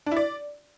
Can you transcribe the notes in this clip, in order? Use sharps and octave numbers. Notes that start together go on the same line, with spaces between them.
D4
E4
D5